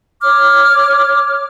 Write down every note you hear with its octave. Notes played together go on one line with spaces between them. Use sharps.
C#5 D6 F6